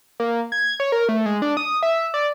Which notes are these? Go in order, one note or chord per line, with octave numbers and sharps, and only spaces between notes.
A#3
G#6
C#5
A#4
A3
G#3
D4
D#6
E5
D5